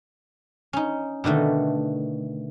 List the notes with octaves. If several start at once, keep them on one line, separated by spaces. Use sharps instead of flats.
C#4 D#4
B2 D3 D#3 A3